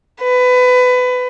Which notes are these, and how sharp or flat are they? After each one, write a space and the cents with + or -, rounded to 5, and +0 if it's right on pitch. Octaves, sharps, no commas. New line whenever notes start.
B4 +25